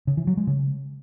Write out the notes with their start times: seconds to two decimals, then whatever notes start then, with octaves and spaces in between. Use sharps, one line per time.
0.07 C#3
0.17 E3
0.27 F#3
0.37 G#3
0.47 C#3